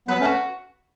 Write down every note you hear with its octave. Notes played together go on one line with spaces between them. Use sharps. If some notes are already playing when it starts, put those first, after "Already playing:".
F#3 B3 B4
A3 C#4
F#4